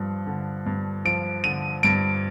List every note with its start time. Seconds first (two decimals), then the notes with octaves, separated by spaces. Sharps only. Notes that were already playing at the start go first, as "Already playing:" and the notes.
Already playing: G2 F3
0.26 D3
0.66 G2
1.05 F3 D7
1.44 D3 D#7
1.83 G2 D7